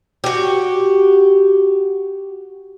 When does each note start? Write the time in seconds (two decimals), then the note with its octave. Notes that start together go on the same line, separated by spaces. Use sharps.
0.24 F#4 G4